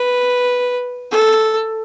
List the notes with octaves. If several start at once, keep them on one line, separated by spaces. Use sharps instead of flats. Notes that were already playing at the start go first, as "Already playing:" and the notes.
Already playing: B4
A4